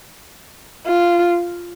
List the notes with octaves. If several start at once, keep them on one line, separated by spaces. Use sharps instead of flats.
F4